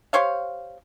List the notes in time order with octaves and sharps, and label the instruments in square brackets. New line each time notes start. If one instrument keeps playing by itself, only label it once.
[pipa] G4 C5 C#5 F5